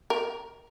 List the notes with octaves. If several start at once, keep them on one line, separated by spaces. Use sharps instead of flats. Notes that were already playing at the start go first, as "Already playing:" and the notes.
A#4